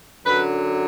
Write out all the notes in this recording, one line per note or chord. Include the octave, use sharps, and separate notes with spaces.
F#2 D3 F#3 B4